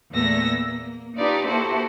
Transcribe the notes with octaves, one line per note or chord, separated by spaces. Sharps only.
E2 A#2 A3 B3 E6 A#6
A#3
D4 D#4 F4 G4 B4 D5
A#3 E4 F#4 G4 A4 C5